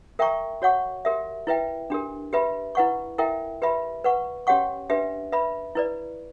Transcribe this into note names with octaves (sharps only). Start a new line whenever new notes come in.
A#4 E5 G5 A#5 C#6
F#4 C#5 F#5 C#6
G4 A#4 E5
E4 B4 E5 G5
D4 G4 A#4
G4 B4 E5 B5
E4 B4 F#5 C#6
E4 A#4 E5 G5
G4 B4 E5 B5
B4 F#5 C#6
C#4 G4 C#5 F#5 C#6
D4 G4 B4 E5
B4 E5 B5
E4 B4 D5